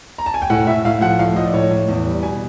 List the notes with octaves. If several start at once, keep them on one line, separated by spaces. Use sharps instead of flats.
A#5
A5
G#5
G5
A2 F#5
A2 E5
A2 F5
F3 F#5
A2 F5
F3 D#5
D5
A2 C#5
A2
E2
G3
B2 G#5